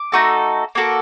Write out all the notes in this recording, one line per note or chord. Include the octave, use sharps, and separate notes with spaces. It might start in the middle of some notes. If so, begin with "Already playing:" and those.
Already playing: D6
A3 D#4 F#4 A4
A#3 F#4 A4